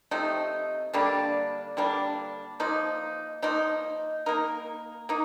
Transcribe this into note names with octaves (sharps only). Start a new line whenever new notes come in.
C3 F3 A3 D#4
D3 G3 A#3 D4
D3 G3 A#3 D4
F3 A#3 D#4
F3 A#3 D#4
A#3 D#4 A#4
A#3 D#4